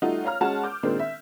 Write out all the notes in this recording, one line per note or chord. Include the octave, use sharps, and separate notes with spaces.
G3 A3 D#4 F4 F#4
C#5 F5 A#5 F6
G#3 C#4 F#4 A5 E7
D6 G6
A#2 D#3 G#3 C4 D4
E5